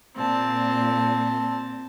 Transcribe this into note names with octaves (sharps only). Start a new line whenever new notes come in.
A#2 C4 A5